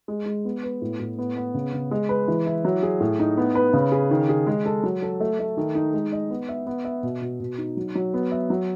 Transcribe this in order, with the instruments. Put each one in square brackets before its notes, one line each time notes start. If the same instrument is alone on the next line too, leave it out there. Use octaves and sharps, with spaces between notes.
[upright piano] G#3
G#3
B3
B4
A2
A2
B3
B3
C#3
C#3
G#3
B4
E3
E4
F#3
G#4
A2
D#4
B3
B4
C#3
G#4
D#3
G#4
G#3
A4
F#3
A4
A3
A3
D#3
D#4
G#3
D#5
B3
E5
B3
E5
B2
B2
B2
D#4
F#3
F#3
B3
E5
F#3